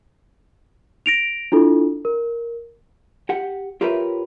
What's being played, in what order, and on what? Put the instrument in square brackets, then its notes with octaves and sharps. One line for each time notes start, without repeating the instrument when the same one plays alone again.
[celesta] A#6 D7 F7
D4 E4 F4 A4
A#4
[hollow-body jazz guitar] G4 F#5
F4 G4 A#4 B4 C#5 E5